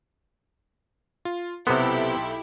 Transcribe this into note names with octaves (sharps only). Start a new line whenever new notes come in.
F4
B1 C3 B3 E4 G4 A4 C6